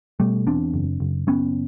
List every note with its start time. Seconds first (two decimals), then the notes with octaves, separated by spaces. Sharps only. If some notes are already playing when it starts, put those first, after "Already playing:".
0.20 B2 G3 A3
0.47 E2 C4 D4
0.74 F#1
1.00 F#1
1.27 F#1 B3 C#4